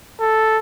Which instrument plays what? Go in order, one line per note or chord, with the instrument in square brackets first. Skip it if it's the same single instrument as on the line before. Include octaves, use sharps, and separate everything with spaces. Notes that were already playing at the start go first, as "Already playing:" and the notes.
[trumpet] A4